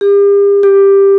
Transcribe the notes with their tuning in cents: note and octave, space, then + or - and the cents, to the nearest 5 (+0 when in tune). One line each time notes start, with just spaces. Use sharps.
G4 +40
G4 +10